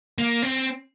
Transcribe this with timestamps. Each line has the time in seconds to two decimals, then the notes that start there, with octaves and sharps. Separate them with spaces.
0.18 A#3
0.42 C4